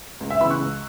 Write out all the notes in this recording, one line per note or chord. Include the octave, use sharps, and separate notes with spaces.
C#2
E5
C#3 E3 B3 B5 E6
C#6 F#6
C#2